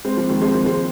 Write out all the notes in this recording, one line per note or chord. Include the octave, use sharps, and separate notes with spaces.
G#3 C4
F3 A#3
D#3 G#3
G#3 C4
F3 A#3
G#3 C4